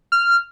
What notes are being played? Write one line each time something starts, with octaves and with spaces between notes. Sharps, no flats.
F6